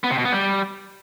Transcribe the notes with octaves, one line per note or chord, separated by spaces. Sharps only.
B3
C3
B2
B3
G3